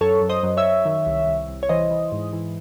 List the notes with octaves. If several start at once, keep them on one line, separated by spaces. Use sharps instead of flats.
F#2 A4 C#5
F#2
C5 D#5
F#2
C#5 E5
F#2
D#3
C2
C2
C2
C#5
E3 C5 D#5
E3
G#2
E3